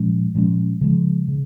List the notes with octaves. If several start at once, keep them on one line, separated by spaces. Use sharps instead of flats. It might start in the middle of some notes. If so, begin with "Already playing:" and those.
Already playing: A#2 F3 G#3 C#4
A#2 F3 G#3 C#4
C#3 F3 G#3
C#3